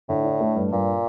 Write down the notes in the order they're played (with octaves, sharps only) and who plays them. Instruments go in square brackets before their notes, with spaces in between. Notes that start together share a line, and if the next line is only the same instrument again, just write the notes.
[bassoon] A2 [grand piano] D3
[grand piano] D4
A3
G2
[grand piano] G2 [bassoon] A#2